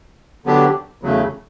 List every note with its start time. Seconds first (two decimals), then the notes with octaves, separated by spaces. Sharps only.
0.45 D3 F#3 B3 D4 G4
1.02 E2 C#3 F#3 A3